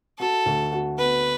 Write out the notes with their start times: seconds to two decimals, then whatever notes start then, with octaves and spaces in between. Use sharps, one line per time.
0.19 F#4 A4
0.46 D2
0.72 F#4
0.98 B3 B4